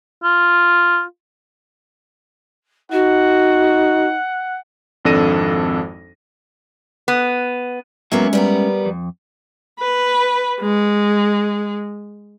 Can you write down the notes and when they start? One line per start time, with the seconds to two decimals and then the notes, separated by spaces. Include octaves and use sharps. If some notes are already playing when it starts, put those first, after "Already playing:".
0.24 F4
2.92 D#4 F#4 F#5
5.05 G#1 F2 D4 A4 A#6 D#7
7.08 B3
8.12 F#3 G#3 A#3 B3 C#4 E5
8.33 G3 B3 A#4
8.86 F2
9.79 B4
10.60 G#3